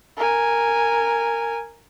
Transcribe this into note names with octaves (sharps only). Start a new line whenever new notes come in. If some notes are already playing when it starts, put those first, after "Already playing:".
A#4 G#5